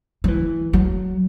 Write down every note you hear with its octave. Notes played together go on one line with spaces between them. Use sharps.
F#3
E3
F#3